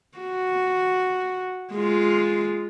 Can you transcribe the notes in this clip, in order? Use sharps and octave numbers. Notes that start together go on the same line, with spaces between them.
F#4
G#3 F4